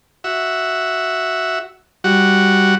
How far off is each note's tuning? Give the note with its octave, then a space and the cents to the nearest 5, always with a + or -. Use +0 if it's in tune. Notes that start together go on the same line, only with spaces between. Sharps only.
F#4 +0 E5 +0
G3 +0 F#4 +0